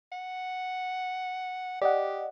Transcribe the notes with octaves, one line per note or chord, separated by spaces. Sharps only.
F#5
G4 D5 D#5 F#5